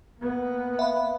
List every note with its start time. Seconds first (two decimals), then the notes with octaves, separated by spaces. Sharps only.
0.20 A#3 B3
0.79 E5 F5 B5